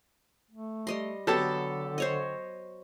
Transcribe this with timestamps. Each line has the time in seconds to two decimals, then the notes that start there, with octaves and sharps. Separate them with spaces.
0.51 A3
0.87 G3 D#5 C6
1.27 D3 F#3 B3 G4 A4 A5
1.98 C5 C#5 D#5